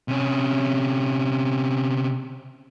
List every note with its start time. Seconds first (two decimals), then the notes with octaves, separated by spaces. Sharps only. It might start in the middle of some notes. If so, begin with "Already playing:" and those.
0.08 C3 C#4